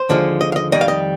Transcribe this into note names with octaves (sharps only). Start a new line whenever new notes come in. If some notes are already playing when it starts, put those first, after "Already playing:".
Already playing: C5
D#2 D3 F3 G#3
D#5
F5
D#5
F2 D#3 G3 D#5
F5
D#5